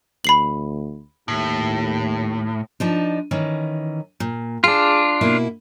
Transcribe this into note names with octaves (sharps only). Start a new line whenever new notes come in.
D2 B5 C7 F#7
D#2 A2
F3 D4 D#4
D#3 E3 C#4
A#2
D4 F4 G#4
B2 A#3 E4